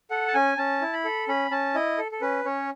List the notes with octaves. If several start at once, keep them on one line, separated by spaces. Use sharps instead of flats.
A4 F#5
A5
C#4 G#5
C#4 A5
E4
B5
A4
C#4 B5
C#4 A5
E4 D#5
A4
A4
C#4 B4
C#4 C#5